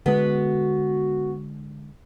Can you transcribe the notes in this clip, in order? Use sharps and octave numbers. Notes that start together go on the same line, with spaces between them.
D3 G#3 B3 F#4